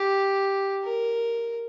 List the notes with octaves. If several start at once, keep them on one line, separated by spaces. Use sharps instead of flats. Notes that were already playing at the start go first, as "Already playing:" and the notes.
Already playing: G4
A#4